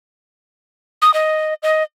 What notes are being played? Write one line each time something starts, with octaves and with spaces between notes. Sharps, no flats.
D#6
D#5
D#5